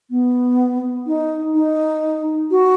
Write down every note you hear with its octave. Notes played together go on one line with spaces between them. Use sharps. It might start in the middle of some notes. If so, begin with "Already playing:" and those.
B3
D#4
D#4
F#4